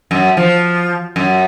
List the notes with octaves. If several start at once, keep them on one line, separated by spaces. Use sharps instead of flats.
F#2
F3
F#2